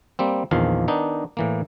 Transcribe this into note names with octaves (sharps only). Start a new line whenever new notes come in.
G3 A#3 C4
A#1 E2 D#3 F3 F5
D#3 B3 D4 D#4
A2 E3 A#3